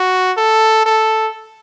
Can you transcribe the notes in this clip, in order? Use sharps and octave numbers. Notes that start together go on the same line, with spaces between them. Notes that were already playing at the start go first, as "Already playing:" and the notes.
Already playing: F#4
A4
A4